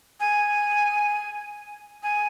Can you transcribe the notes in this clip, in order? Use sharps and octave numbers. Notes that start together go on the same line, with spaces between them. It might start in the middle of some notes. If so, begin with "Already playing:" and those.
G#5
G#5